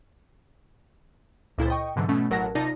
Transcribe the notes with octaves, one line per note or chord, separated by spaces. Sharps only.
C#2 A#2 E4 A4 C5 A6
D#5 G5 C#6
G#2 B2 D3 E3 F#3
B2 A3 C#4
A1 F#3 A#4 F#5 A5 A#6
C3 D#4 F4 D5 A5 A#6